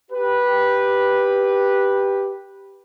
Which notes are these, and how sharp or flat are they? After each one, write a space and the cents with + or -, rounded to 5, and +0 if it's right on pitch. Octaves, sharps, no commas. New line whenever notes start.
G4 +0 B4 -10